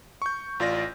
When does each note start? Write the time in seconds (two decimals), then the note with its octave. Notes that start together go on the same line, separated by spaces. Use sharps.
0.22 C#6 G6
0.60 A1 F4 D5 A#6